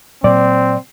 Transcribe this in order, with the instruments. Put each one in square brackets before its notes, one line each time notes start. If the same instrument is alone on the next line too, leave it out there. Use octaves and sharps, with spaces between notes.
[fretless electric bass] A#2 F#3 [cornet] C4 [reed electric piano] D5